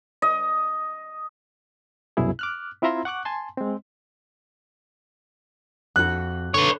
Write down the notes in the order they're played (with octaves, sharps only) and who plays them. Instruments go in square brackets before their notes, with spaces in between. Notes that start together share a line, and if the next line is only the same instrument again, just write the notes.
[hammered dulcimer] D#5
[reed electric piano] C2 F#2 B2 E4 G#4
D6 F6 F#6
C4 E4 F4 E5 A#5 C6
F#5 C#6 D6 F#6
G#5 A5 C6
G#3 C4
[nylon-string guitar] F2 F#4 [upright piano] F#6
[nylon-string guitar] D3 [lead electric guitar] B4 C#5